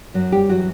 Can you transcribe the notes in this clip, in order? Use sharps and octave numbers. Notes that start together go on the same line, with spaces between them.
F#2 F#3 F#4
G3 G4
E3 F#3 F#4